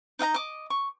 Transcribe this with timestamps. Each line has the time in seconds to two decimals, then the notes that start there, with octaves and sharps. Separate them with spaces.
0.19 D#4 D#5 F#5 A#5
0.34 D#5 D6
0.70 C#6